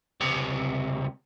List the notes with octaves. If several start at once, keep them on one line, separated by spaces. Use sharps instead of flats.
C#2 C3